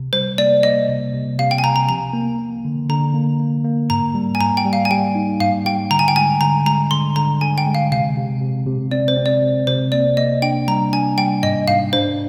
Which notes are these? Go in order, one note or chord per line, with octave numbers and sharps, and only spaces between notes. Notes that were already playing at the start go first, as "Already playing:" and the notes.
Already playing: C3
G3 C5
A#3 D5
A#3 D#5
C3
C3
C3 F5
G5
G#5
C3 A#5
A#5
F3 A#5
A#3
A#3
D3
D3 A#5
A#3
A#3
A#3
G#2 A#5
G3
G#5
G#2 A#5
G5
G3
F5
G#5
G3 G5
D#4
G#2 F5
G3 G5
D3 A#5
G#5
G5
G#3 G#5
D3 A#5
G#3 A#5
D3 C6
D3 A#5
D3 G#5
G5
G#3
F5
C3 F5
C3
C3
C3
C4 D5
C5
C4
D5
C3
C3 C5
A#3 D5
A#3 D#5
D4 G5
G3 A#5
D4 G#5
G3 G5
G#2 D#5
G#2 F5
D4 C5